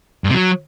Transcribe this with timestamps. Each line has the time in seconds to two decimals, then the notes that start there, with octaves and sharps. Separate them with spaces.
0.24 G2
0.29 C3
0.34 F#3